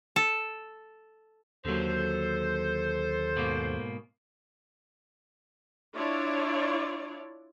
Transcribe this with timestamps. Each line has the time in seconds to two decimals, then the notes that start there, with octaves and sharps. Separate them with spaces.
0.16 A4
1.65 D#2 D3 F#3 A4 C5
3.36 G#2 B2 A#3
5.95 D4 E4 F4 C#5 D5